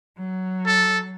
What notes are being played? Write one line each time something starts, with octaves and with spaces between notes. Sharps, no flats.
F#3
A4